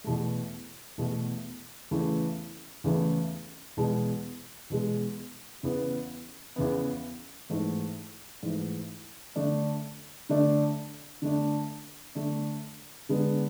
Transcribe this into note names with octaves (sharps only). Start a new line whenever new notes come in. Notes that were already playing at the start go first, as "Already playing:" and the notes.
E2 B2 A3
E2 B2 A3
E2 C#3 E3 A3
E2 C#3 E3 A3
E2 B2 G#3
E2 B2 G#3
E2 C#3 E3 B3
E2 C#3 E3 B3
G#2 E3 A3
G#2 E3 A3
D3 A3 D4
D3 A3 D4
D3 A3 D4
D3 A3 D4
D3 G#3 B3